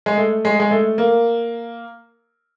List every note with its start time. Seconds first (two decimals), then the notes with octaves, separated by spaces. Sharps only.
0.06 G#3
0.17 A3
0.45 G#3
0.60 G#3
0.71 A3
0.98 A#3